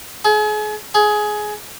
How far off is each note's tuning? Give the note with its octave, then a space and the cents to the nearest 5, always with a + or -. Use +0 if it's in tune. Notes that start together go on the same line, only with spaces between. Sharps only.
G#4 +35
G#4 +15